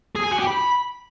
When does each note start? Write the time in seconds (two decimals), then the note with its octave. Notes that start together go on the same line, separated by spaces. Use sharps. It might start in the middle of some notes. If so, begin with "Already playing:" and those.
0.15 G#4
0.23 G#5
0.31 F#4
0.39 G4
0.47 B5